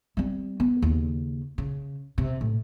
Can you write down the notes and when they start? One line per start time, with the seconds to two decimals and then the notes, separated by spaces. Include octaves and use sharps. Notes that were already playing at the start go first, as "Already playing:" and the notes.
0.17 G3 C4
0.60 B3
0.82 D#2 C#3
1.58 C#3
2.18 C3
2.41 A2